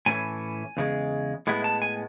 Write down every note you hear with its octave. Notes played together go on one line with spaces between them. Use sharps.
A2 E3 A3 C#4 E4 G#5
E2 C#3 G#3
A2 G#3 B3 E4
A5
G#5